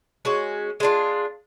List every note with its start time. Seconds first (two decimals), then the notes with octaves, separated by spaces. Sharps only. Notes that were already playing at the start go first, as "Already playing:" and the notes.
0.25 G#3 C#4 F#4
0.80 G#3 D4 F4